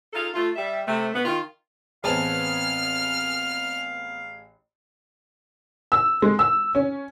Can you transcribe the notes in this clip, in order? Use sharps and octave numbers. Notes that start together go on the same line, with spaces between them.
D#4 F4 G#4 A4 F5
A3 F4
G3 E5
C3 A3
B2 B3
D#3 F4
A1 B3 C4 G#4 C#5 F5 A5 F6
E6
G#3
E6
C#4